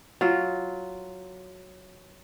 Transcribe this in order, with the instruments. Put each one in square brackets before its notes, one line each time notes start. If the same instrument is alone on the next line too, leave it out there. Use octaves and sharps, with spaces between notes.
[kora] F#3 F4